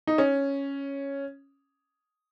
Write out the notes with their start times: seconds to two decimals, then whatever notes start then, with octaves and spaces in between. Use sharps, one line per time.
0.07 D#4
0.18 C#4